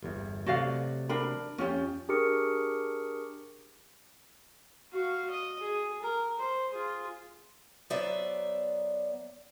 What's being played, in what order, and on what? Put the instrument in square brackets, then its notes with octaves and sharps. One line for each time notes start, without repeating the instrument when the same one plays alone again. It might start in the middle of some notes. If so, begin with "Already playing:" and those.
[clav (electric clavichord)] G1 E2
[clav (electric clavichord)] C3 F#3 A3 [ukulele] F#4 D5 F5
[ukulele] D4 A#4 B5
[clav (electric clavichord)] F2 [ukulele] C#4 F4 G4
[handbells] D4 G4 G#4 A#4 C#6 C#7
[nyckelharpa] F#4 F5
D#5
G#4
A#4
C5
F4 G#4
[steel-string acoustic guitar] F#3 B3 C5 D5 E5